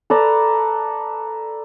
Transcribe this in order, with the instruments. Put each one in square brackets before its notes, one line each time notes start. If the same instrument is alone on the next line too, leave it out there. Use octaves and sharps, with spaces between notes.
[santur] A4 B4 D5 A#5